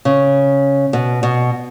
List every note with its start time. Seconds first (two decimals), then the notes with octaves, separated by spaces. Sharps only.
0.05 C#3
0.93 B2
1.23 B2